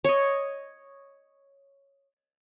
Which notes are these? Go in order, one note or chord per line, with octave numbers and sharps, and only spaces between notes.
C#5 D#5